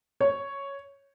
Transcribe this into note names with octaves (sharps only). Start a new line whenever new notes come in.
C#5